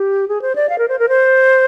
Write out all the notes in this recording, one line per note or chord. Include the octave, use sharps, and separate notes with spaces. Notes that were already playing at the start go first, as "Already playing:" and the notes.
Already playing: G4
G#4
C5
D5
F5
A#4
C5
A#4
C5